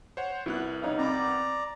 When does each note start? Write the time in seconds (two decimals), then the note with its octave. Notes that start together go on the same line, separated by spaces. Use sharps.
0.17 C5 C#5 F#5
0.46 C2 B3 E4 F#6
0.82 D#4 C#5 F5
0.98 C4 D5 A#5 B5 D6